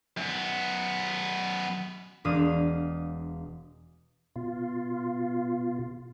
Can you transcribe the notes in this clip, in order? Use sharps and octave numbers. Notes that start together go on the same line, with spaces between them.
F#2 B3
E1 D4 F5 D#6
B2 F4